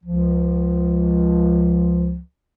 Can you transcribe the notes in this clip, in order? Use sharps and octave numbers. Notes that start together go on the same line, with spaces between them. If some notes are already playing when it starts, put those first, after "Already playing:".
C#2 F3